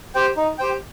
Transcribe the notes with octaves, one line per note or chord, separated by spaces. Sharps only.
G4 C5 G5
D#4
G4 C5 G5